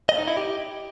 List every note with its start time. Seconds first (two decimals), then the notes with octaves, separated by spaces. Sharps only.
0.09 D#5
0.18 D#4
0.28 E4
0.37 G4